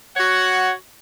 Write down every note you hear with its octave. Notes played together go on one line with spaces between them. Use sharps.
F#4 C#5 F#5